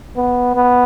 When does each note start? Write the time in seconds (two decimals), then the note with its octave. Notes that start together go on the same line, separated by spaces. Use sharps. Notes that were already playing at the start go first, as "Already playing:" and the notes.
0.17 B3
0.56 B3